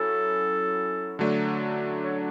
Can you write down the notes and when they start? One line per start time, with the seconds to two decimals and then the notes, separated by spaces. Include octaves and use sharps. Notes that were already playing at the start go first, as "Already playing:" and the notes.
Already playing: F#3 C#4 E4 A4
1.19 D3 F#3 A3 D4
2.04 C#5